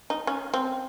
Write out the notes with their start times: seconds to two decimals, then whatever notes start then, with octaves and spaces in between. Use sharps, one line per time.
0.10 D#4
0.27 C#4
0.54 C4